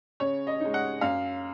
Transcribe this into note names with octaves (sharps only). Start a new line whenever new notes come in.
C#3 C#5
D#5
G#3 D#4
F#5
F#2 F5